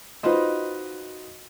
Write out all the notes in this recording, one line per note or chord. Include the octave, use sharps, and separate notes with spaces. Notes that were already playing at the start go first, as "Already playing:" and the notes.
D#4 F4 F#4 B4 C5 D#5